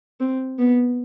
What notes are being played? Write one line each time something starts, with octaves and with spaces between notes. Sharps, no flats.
C4
B3